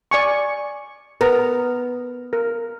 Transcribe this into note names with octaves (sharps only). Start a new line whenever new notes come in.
D5 G#5 C#6
B3 A#4 A#5
A#4